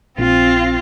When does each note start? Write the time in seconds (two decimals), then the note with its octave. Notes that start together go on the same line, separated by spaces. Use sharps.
0.18 A#1 C4 F4